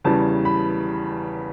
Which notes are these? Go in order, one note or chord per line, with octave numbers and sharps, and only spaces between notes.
E2 C#3 E3 G3 A5
B5